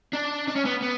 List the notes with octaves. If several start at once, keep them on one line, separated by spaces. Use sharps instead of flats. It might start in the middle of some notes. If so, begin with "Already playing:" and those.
D4
D4
C#4
B3
B3